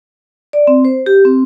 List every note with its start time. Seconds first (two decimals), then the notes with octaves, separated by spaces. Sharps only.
0.53 D5
0.67 C4
0.85 C5
1.06 G4
1.25 C4